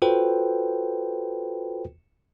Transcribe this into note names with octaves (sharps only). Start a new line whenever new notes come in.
F4 F#4 A4 B4 C5 G5